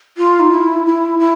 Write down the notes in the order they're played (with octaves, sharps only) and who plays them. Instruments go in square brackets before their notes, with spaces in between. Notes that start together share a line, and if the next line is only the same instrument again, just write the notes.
[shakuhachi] F4
D#4
E4
E4
E4